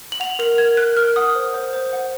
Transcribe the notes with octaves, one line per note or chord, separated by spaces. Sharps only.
F#7
F#5 F7
A#4 F7
A#4 G#6
A#4 F#6
A#4 F6
F#5 D#6
C5
C5
C5
F#5